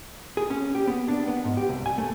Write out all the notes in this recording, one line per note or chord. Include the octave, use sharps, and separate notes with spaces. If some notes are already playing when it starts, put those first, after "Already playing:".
G#4
C#4
G4
B3
D4
B3
G#2
G4
C2
G#5
A3